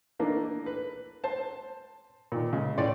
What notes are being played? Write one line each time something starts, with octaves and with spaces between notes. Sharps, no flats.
E3 A3 A#3 D4 D#4
B4
C5 A5
A#2 D#3
C#3 G#3
A2 C#5 D5 C6